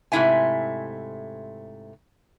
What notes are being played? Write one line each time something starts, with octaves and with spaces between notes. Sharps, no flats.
G#2 C3 A3 E4 E5 G#5